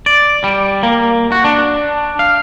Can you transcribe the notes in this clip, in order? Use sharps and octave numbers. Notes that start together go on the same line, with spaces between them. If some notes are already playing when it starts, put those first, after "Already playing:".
D5
G3
A#3
F#4
D4
F5